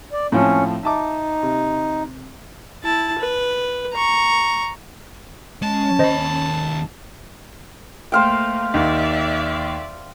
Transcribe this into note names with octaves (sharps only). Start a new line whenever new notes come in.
D5
A2 F3 C4 C#4
D#4 E5 A5 D6
C3
E4 A5
B4
A#5 C#6
G#3 C#4 A5
D#2 C5 D#5 B5
A3 A#3 C5 F5 G5
D#2 D#4 D5 E5